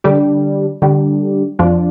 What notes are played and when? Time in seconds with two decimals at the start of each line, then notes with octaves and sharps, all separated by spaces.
0.04 D3 G3 D4 G4
0.82 D3 G3 D4 G4
1.59 F2 F3 D4 F4